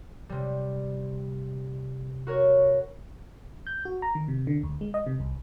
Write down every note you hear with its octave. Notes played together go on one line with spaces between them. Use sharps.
C3 G3
F#4 A#4 C#5
G6
F#4
A#5
D#3
C3
D3
D2
G#3
D#5
C3
C2